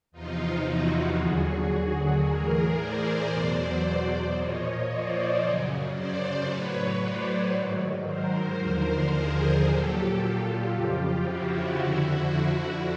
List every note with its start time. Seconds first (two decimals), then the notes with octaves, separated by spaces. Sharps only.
0.12 E2 C3 F3 D#4 F4
0.65 E4 F#4
1.18 D#2 D3 F#3 F#4 G#4
2.24 A2 E3 G#4 A#4
2.77 C5 D5
3.29 E2 B2 F#3
4.35 A#2 F3 C#5 D#5
4.88 C5 D5
5.41 F#2 C#3 F#3
5.94 C5 D5
6.46 A2 F#3 B4 C#5
7.00 C5 D5
7.53 G#2 D#3 F#3
8.06 A#4 C5
8.58 D#2 D3 F3 A#4 C5
9.12 G#4 A#4
9.65 A#2 F#3 G4 A4
10.17 F4 G4
10.70 F2 C#3 F3 F4 G4
11.23 E4 F#4
11.76 F2 D3 F3